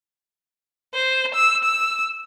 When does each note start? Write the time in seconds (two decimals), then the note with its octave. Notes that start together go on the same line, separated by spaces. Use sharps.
0.95 C5
1.35 E6
1.64 E6